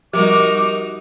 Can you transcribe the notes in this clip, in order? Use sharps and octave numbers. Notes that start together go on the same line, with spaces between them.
F3 G3 D#4 F#4 G4 A#4 D6